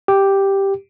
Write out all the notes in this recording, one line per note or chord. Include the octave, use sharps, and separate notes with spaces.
G4